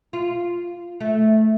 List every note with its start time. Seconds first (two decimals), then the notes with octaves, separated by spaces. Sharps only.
0.13 F4
1.00 A3